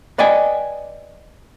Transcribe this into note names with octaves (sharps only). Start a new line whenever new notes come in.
B4 D5 D#5 G5 G#5